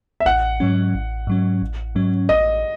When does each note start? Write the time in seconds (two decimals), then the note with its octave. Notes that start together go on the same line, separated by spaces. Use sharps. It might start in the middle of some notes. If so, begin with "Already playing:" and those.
0.20 E5
0.25 A1 F#5
0.60 G#2 F#3 C#4
0.94 A1
1.27 G#2 F#3 C#4
1.62 A1
1.95 G#2 F#3 C#4
2.29 A1 D#5